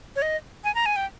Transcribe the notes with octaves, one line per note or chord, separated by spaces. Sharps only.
C#5
D#5
G#5
A#5
G#5
G5